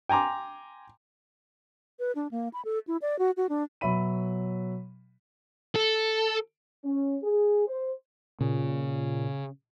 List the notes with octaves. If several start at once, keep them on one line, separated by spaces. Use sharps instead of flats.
G5 G#5 A#5 C6 D6
B4
D4
A#3
B5
A4
E4
D5
F#4
F#4
D4
B2 F#3 C#5 E5 B5 D#7
A4
C#4
G#4
C5
A#2 C#3